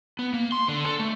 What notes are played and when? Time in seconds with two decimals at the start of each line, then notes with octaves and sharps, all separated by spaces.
0.19 B3
0.34 A#3
0.52 C6
0.68 D3
0.86 A4
0.99 A3